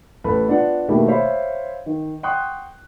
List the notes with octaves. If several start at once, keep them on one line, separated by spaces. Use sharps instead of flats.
A1 A4 B4 B5
B3 D4 F4 F#5
B2 D#3 A3 A#3 E4 G4
C5 C#5 E5 F5 B5 C6
D#3
F#5 G5 C6 C#6 D#6 F#6